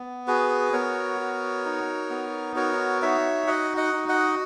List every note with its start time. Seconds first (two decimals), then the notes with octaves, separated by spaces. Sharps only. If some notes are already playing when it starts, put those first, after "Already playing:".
Already playing: B3
0.27 F#4 G#4 B4
0.73 B3 A#4 C#5
1.19 F#4
1.65 D#4
2.10 B3
2.55 F#4 A#4 C#5
3.02 D#4 C#5 E5
3.47 F#4 D#5 F#5
3.77 D#5 F#5
3.93 D#4
4.09 D#5 F#5